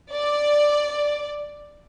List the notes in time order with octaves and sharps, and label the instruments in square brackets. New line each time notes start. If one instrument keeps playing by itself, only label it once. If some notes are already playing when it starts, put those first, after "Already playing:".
[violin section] D5